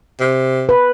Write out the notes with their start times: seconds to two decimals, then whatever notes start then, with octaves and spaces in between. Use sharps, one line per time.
0.20 C3
0.69 B4